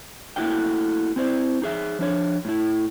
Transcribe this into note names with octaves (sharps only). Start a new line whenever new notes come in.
A3 A#3 E4 F#4 F5 G5
C4 E4 C5
D#4 G#4 E5
F3 D4 C#5
A2 E4